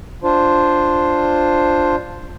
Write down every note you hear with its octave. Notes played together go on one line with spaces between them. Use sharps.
D4 F4 C5